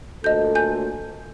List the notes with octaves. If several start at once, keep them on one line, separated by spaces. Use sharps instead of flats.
D2 A#2 A4 D#5 G6
G#5 G6